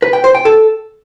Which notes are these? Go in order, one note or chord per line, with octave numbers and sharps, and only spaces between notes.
B4
G5
C5
G5
A4